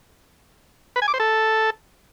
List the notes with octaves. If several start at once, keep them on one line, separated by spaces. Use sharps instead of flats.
B4
G#5
D6
C5
A4